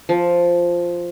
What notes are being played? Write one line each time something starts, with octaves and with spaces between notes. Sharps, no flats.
F3